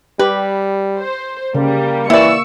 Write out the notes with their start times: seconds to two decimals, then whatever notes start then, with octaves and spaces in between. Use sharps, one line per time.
0.19 G3 G4 B4
0.99 C5
1.55 C#3 G3 A#3
2.10 E3 A#3 E4 D5 C#6 E6